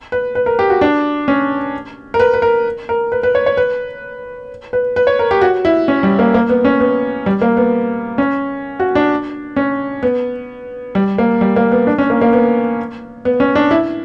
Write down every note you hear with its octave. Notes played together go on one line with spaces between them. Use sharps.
B4
B4
A#4
G4
F#4
D4
C#4
A#4
B4
B4
A#4
A#4
B4
B4
C#5
C#5
B4
B4
B4
C#5
A#4
G4
F#4
E4
C#4
G3
A#3
A#3
B3
C#4
B3
G3
A#3
B3
C#4
F#4
D4
C#4
B3
G3
A#3
G3
A#3
B3
D4
C#4
A#3
A#3
B3
B3
C#4
D4
E4